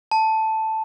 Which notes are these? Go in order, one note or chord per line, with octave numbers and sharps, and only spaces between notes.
A5